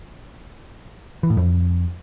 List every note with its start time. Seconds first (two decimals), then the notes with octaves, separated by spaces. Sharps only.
1.23 E3
1.30 A2
1.37 F2